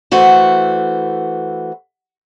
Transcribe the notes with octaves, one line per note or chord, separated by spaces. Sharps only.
E3 A3 F#4 C5